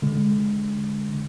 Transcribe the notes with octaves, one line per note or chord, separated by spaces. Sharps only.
D3 G#3